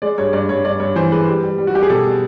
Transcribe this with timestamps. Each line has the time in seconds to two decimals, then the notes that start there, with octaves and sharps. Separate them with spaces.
0.02 G#3 D5
0.18 G2 C#5
0.33 G2 D5
0.49 G2 C#5
0.64 G2 D5
0.80 G2 C#5
0.96 E3 C5
1.11 G#3 B4
1.28 G3
1.43 G3
1.58 G3
1.67 F#4
1.74 G3 G4
1.83 G#4
1.90 B2 A4
2.05 G3